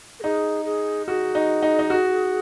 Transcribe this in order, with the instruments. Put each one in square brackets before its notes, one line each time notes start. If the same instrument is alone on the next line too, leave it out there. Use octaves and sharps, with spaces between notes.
[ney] A#4
[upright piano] D#4 [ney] G#4
[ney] G#4
[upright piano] F#4 [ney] G#4
[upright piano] D#4
D#4
D#4
F#4